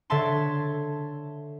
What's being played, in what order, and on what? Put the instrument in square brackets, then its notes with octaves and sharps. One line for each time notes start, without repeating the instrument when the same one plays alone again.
[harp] D3 C#5 E5 A5 C6